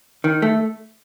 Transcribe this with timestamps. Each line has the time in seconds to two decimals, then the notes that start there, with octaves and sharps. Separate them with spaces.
0.24 D#3
0.42 A3